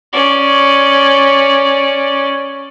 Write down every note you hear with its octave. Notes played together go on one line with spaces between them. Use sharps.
C#4 D5